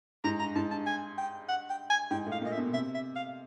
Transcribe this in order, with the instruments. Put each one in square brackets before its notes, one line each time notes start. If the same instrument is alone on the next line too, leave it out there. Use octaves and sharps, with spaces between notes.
[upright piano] G#2 [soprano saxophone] A#5
[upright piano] G2 [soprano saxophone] A#5
[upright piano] G#2 [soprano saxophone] A5
[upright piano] G2 [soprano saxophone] A5
[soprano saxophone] G#5
G5
F#5
G5
G#5
[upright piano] G#2 [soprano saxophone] G5
[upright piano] A2 [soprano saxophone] F5
[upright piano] A#2 [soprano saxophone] D#5
[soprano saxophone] E5
[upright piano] B2
[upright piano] C3 [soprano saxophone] E5
[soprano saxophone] E5
F5